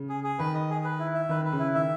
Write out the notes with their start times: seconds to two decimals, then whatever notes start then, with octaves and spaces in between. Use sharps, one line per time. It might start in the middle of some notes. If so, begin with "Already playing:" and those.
Already playing: C#3
0.09 G#4
0.24 G#4
0.39 D#3 B4
0.54 D#5
0.70 G#4
0.84 B4
0.99 E4
1.15 E5
1.29 D#3 B4
1.45 B4
1.52 C#3
1.59 E4
1.75 D#3 E5